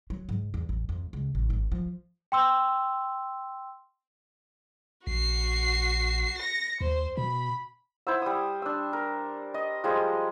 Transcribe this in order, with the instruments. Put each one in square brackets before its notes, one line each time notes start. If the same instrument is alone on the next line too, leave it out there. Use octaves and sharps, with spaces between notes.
[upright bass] F#3
G#2
E2
A1
F2
C#2
A1
G#1
F3
[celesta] G5 C6 E6
[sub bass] A#1 [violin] F#4 C7
[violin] A#6 C#7
[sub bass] D#2 [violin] C5
[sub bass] B2 [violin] B5
[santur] E4 C5 F#5 E6
G3 D#6
D4 E6
A#4
D#5
F3 G3 G#3 G#4